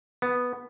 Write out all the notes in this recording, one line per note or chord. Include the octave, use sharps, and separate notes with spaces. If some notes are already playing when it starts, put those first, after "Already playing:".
B3